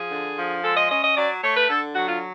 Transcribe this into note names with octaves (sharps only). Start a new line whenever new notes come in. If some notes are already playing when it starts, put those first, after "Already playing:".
Already playing: F3 G#4
D3
F3
G#3 A4
D#5
C#4 D#5
D#5
F#3 D5
A3 C#5
B4
D3 A4
F#3 F#4
F4